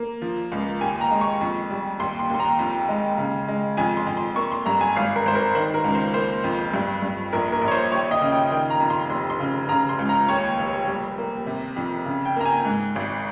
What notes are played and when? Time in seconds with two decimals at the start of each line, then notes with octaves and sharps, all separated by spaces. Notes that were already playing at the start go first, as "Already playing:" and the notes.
Already playing: A#3
0.22 F3
0.52 C#2
0.81 D#2 G#5
1.01 A#5
1.11 G#3
1.21 C#6
1.41 F2
1.70 G3
2.00 D#2 C6
2.19 C6
2.30 D#2 C6
2.40 A#5
2.59 F2
2.88 G#3
3.18 C#3
3.48 G#3
3.77 F2 G#5
3.97 C6
4.07 F2
4.17 C6
4.36 A#3 C#6
4.52 C6
4.66 G2 A#5
4.81 G#5
4.96 G#1 F5
5.16 A#4
5.26 G#1 C5
5.35 A#4
5.55 D#3 C5
5.74 A#4
5.84 C#2
5.95 C5
6.14 A#3 C5
6.44 F2
6.74 G2
7.02 G2
7.33 A#1 A#4
7.52 A#4
7.62 A#1
7.68 C#5
7.71 C5
7.92 D#2 C#5
8.11 D#5
8.21 C#3
8.31 G5
8.51 D#3 G5
8.70 A#5
8.80 F2
8.90 C6
9.10 F1 C6
9.30 C6
9.40 C#3
9.69 C#3 A#5
9.89 C6
9.99 C#2
10.09 A#5
10.29 D#2 C#5
10.58 F1
10.87 G3
11.18 A#3
11.47 C3
11.76 F2
12.06 C#3
12.26 G5
12.36 A#3 A#5
12.45 G#5
12.65 G#2
12.96 G#1